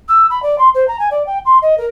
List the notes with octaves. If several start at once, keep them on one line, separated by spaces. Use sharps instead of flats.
E6
B5
D5
C6
C5
A#5
G#5
D5
G5
C6
D#5
A#4